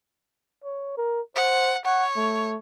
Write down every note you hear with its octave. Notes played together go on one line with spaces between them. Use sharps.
C#5
A#4
C5 F#5
C#5 F#5
A3